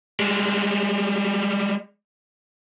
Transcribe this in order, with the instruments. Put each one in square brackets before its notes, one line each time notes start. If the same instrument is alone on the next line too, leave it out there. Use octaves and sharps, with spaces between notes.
[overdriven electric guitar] G3 G#3